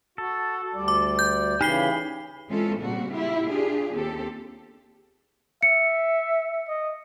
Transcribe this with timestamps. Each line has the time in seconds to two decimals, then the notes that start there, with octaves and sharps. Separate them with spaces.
0.18 F#4 A4
0.75 D2 G3 D5
0.88 D6
1.19 G6
1.61 C#3 E3 D#4 G4 G#4 B5 C7 G7
2.49 E3 G#3 C4 C#4 F4 A4
2.80 A#2 C#3 G3 A#3 C4 F#4
3.13 E4 F4 G4
3.46 D4 F4 G4 G#4
3.92 D#2 C4 G4 A4
5.63 E5 C#7
6.68 D#5